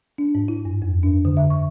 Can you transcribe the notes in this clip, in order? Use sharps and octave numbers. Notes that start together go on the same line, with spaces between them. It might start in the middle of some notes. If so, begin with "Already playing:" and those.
D4
G#2
E4
G2
F2
D4
D3
E5
C#6